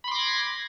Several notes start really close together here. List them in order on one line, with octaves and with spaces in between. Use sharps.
B5 C6 D6 A#6 G#6